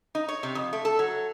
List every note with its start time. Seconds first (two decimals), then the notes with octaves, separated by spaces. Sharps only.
0.15 D#4
0.28 C#5
0.43 C3
0.55 F2
0.73 A3
0.85 A4
0.99 F#3